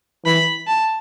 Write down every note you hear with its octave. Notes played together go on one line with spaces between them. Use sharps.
E3 B5
A5